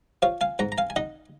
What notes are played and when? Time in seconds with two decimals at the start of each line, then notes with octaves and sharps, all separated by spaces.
0.22 F3 C#5 F5
0.41 F5 G#5
0.59 G#2 F#5 A#5
0.72 A#5
0.78 F5 G#5
0.90 G#5
0.96 D#4 D#5 F#5